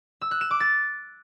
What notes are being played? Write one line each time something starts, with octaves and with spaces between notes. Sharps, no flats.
E6
F#6
E7
D6
A6